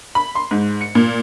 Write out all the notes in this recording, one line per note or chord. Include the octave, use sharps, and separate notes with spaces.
B5
C6
G#2
C#7
A#2